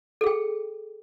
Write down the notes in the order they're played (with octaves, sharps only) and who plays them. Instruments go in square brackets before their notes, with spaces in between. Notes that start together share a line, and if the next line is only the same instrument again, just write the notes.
[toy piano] A4
G#4
G5